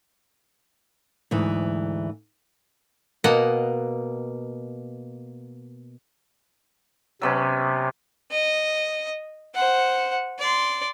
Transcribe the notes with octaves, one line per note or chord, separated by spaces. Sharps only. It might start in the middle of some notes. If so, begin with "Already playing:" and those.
D2 G#2 E3
B2 A#3 D#5 F#5
C3 F#3 B3 C#4
D#5
C5 F#5
D5 C6